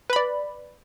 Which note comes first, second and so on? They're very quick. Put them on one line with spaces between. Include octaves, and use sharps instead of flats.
B4 B5 D5